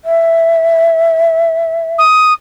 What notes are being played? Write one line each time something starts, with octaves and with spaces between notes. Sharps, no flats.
E5
D#6